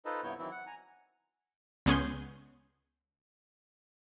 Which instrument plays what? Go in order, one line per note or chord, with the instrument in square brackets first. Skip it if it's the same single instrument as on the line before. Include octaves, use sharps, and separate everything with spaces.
[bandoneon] D#4 F4 A4 B4 C5 D#5
G2 C3 B3 E4 C#5 G6
D#3 E3 F#3 C4 E4
F#5
G#5 A#5
[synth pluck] C#2 B3 C#4 G#4 C6 G6